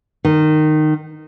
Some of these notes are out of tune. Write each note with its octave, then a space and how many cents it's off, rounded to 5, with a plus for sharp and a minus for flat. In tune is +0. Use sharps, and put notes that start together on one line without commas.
D#3 -15